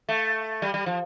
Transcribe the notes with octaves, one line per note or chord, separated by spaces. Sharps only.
A3
G3
G3
F3